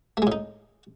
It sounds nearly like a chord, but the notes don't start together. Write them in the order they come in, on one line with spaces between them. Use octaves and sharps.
A3 G#3 A2 D#4